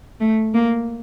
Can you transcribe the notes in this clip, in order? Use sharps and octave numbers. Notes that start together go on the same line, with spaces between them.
A3
A#3